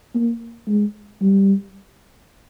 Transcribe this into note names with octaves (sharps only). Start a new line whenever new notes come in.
A#3
G#3
G3